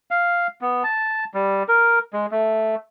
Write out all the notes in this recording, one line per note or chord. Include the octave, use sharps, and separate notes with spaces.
F5
B3
A5
G3
A#4
G#3
A3